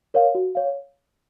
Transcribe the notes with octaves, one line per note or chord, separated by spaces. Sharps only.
A#4 C#5 F5
F#4
C#5 F5